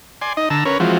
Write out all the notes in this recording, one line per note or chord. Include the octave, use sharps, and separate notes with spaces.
D5 G#5 C6
D#4 D#5
D3 A5 A#5 E6
C#4 A#4 B4 C#5
E3 F3 G#3 C4 F4 F#4